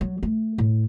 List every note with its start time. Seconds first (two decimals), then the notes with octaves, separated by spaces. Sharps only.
0.01 F#3
0.23 A3
0.58 A2